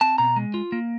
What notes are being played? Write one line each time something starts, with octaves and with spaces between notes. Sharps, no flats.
C4 A5
B2 A#5
G#3
F4
A#3